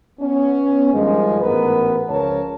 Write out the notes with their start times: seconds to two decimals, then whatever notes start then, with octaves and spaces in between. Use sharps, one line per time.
0.20 B3 C#4
0.92 G2 D#3 F3 G#3
1.40 A1 G#2 B3 A#4 B4
2.09 C#2 F3 A#4 C#5 A5